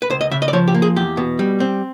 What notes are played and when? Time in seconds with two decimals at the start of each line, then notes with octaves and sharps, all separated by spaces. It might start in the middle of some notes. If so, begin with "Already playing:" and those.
0.02 B4
0.10 C#2 C5
0.21 D#5
0.31 C#3 E5
0.42 D#5
0.48 D5
0.53 F3 C#5
0.68 G4
0.74 A#3
0.82 G#4
0.96 E2 G4
1.17 B2
1.39 G3
1.60 C4